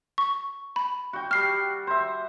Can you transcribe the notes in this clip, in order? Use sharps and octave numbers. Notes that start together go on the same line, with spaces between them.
C#6
B5
F#4 G5
G3 F#4 F6 C7
C5 E5